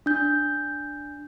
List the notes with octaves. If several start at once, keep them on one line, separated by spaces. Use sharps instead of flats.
D4 G6